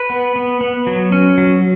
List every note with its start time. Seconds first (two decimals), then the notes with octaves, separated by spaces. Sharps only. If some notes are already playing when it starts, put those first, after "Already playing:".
Already playing: B4
0.10 B3
0.36 B3
0.61 B3
0.87 F#3
1.12 C#4
1.38 F#3